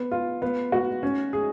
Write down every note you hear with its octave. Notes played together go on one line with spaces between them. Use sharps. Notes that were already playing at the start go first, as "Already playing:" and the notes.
Already playing: B3
F4
B3
F#4
C#4
G#4